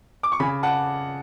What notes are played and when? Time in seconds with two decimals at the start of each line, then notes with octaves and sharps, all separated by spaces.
0.23 D6
0.32 C#6
0.40 C#3 G#5 B5
0.63 F#5 A5